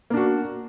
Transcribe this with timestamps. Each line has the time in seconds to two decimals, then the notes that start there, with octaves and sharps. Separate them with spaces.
0.10 A#3
0.14 D4
0.17 F#4